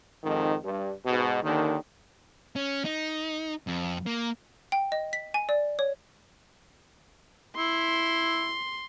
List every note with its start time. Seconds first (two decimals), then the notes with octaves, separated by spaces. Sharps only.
0.23 F2 G#2 D#3
0.64 G2
1.06 G#2 B2
1.43 D#2 D3 D#3
2.56 C#4
2.85 D#4
3.67 F2
4.06 A#3
4.72 G5
4.92 D#5
5.13 B6
5.34 G#5
5.49 D5
5.79 C#5
7.56 E4 C6